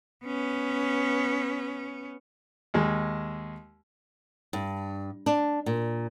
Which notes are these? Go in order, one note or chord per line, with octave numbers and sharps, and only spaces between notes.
B3 C#4
D#2 G#3
G2
D4
A#2